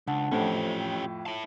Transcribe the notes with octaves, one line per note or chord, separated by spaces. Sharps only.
C#2 D4 F#5 A5
F2 A2 C#4 G4 A4 C5
F4 G5
E4 A5